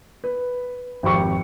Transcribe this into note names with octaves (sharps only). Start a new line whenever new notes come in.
B4
G#1 F2 G4 C#6 C#7